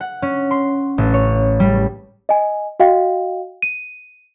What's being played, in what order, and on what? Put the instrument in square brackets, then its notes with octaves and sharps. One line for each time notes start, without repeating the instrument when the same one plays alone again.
[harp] F#5
C#4
C6
A1
C#5
G3
[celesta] D#5 G#5
F#4 D#5 F5 G5
D#7